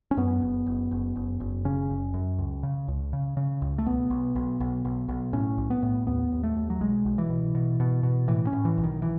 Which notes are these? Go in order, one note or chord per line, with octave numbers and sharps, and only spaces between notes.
C#4
F#2 B3
F#1
F#1
F#1
F#1
F#1
C#3 C#4
F#1
F#2
C#2
C#3
C#2
C#3
C#3
C#2
A3
B1 B3
B1
B1
B1
B1
B1
A2 C#4
B1
B3
A2
D#2 B3
D#2
A3
D#2
F#3
B1 G#3
B1
E3
B2
B2
B2
B2
A2 E3
C#4
A2
E3
B1
D#3
E3